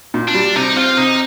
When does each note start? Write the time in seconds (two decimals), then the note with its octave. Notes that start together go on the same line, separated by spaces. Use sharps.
0.14 A#2
0.28 D4
0.34 G3
0.55 C3 D#4
0.76 C4 F4
0.97 C3 D#4